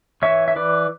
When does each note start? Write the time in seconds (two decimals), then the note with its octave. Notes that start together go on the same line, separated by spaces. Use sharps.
0.22 E3 C#5 E5
0.48 E5
0.56 E3 B4 D5